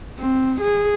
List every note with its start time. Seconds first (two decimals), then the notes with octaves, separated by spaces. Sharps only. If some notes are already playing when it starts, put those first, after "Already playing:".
0.19 C4
0.61 G#4